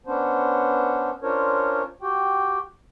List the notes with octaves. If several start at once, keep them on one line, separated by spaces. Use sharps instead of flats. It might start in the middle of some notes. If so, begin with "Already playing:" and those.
B3 C#4 D4 C5
C#4 D4 F4 A#4 C5 C#5
F#4 G4 G5